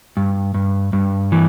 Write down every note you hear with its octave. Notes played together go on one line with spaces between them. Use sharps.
G2
G2
G2
E3